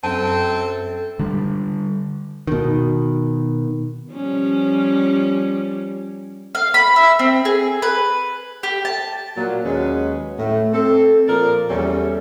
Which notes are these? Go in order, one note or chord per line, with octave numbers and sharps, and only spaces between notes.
F#2 C4 A4 A5
D3 G3
B2 D#3
F3 G3 C#4
F5
B5
E5
C4
G#4
B4
G4
A5
A#2 F#3
D#2 F#3 G#3 C#4 B4
A2 A3
C4 A4
A#2 F3 A#4 D5
E2 G3 C#4 A4